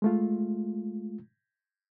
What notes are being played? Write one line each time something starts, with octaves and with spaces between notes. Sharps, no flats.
G#3 A3 F4